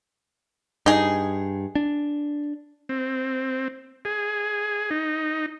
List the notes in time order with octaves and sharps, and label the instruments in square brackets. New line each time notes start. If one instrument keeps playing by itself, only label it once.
[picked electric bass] G2 [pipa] D#4 G#4
[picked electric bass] D4
[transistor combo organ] C4
G#4
D#4